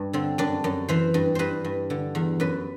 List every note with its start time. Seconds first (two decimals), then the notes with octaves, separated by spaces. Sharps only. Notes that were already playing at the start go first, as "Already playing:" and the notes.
Already playing: G2
0.13 D3 C4
0.38 F#2 D4
0.64 F#2
0.89 E3 C5
1.14 G2
1.35 G2 B4 C5
1.65 G2
1.90 D3
2.15 E2
2.40 F#2 B4